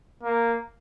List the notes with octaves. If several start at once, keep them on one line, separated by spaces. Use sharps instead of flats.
A#3